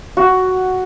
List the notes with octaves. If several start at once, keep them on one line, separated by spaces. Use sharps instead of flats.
F#4